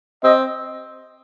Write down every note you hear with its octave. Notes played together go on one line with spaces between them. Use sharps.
C4 D#5